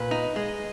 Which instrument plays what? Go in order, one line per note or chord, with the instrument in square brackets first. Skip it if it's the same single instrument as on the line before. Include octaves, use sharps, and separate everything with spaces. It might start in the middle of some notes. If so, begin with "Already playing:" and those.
Already playing: [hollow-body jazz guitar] A#2 [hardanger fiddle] B4
[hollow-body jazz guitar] D#4
[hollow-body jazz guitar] G#3 [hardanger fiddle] D#5